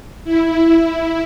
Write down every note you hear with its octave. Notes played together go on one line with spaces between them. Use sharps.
E4